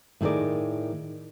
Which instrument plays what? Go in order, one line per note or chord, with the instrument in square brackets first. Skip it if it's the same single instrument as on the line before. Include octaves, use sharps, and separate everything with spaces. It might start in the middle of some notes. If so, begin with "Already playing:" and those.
[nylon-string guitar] A2 D#3 G#4 A#4 D5